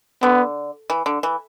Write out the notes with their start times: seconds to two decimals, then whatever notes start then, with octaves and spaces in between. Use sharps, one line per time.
0.22 D3 B3
0.90 E3
1.06 D3
1.23 E3